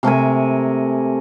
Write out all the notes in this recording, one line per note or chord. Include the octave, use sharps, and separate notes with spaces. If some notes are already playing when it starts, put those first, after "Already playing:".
C3 A3 A#4 G#5